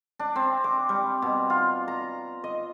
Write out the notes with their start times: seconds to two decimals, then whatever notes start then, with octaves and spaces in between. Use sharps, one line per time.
0.19 D4
0.36 C4
0.64 D6
0.89 G3
1.22 B2
1.50 F4
1.88 A#5
2.44 D#5